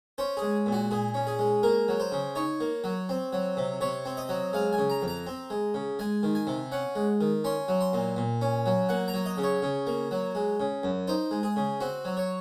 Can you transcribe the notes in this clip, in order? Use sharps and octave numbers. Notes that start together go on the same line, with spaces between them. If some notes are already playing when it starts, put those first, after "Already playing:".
C#4 C5
G#3 G#4
A#2
F#4
A#2 G#4
C#4
G#4
G#3
A#3 A#4
F#3
C5
C#3
D#4 C#5
A#3
F#3
C4
F#3
C3
C3 C#5
C4
D#5
F#3
G#3 F5
G#5
C#3
A#5
F2
A#5
C4
G#3
C#3
G#3 G#5
D#3
G#5
C3
C#4 F#5
G#3
D#3
C#4 C6
F#3
C6
A#2
A#2
C#4
F#3
A#3 F#5
A#5
F#3
D#5
C#3
C#5
C#3
A#3
F#3
G#3
C#3
F#2
D#4 C5
G#3
G#4
C#3
C4 F#4
F#3
C#5